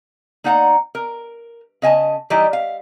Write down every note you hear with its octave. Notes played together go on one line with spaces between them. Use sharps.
A#3 D#4 D5 F#5 G5 A#5
A#4
C#3 D#5 G#5 A5
E3 G3 D#4 E4 D#5
F5